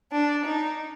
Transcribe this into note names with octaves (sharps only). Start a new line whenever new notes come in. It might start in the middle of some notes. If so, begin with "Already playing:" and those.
D4
D#4